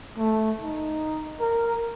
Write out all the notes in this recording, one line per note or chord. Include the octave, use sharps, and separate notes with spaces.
A3
D#4
A#4